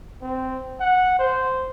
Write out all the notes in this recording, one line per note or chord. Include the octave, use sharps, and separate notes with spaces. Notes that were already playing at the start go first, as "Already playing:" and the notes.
C4
F#5
C5